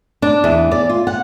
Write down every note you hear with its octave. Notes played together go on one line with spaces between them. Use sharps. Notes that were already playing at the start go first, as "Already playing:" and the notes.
D4
E2
D5
F4
F#5